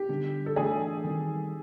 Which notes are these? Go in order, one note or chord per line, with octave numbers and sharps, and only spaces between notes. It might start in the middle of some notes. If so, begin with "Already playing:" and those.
Already playing: G4
D3 G3 B3 D4
A4
E3 A3 D4 F#4 G#4
D#3 G3 C4 D#4